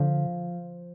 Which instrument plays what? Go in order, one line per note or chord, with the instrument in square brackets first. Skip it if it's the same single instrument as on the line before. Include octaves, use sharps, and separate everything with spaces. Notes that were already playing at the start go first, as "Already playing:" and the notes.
Already playing: [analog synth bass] D3 [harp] F3